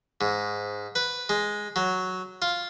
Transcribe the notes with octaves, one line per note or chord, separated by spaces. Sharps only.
G#2
B4
G#3
F#3
F4